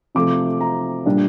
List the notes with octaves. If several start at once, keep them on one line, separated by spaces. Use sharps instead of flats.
C3 F3 A3 D6
A#5
A#2 G3 D4